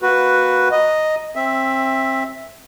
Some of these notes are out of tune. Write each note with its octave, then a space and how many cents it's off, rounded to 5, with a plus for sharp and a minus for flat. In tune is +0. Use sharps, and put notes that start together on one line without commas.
A#3 +0 F#4 +0 B4 +0
D#5 +0 A#5 +0
C4 +25 E5 +0